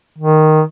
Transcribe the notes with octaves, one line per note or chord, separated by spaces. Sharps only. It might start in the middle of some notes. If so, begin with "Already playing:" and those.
D#3